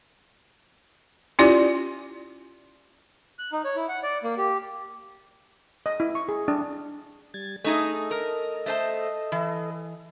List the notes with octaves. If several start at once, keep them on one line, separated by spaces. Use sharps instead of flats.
C#4 E4 F4 G4 D5
F#6
D#4
C#5
E4
F#5
D5
A#3
G4
D#5
E4
C#6
G#4
D4
G3 G#6 A6
A3 D#4 G#4 A4 D#5
A#4
A3 C5 A5
E3